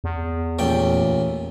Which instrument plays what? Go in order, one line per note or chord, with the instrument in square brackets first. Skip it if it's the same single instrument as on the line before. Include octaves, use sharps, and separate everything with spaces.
[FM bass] E2
[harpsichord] A1 A#2 G5